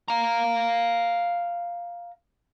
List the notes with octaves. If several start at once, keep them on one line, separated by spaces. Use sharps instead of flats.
F5 A#5